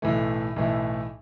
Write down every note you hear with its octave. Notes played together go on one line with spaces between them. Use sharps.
B1 A2 E3 A3
B1 A2 E3 A3